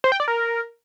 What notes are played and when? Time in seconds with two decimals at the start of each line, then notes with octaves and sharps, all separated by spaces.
0.04 C5
0.12 G5
0.20 D5
0.28 A#4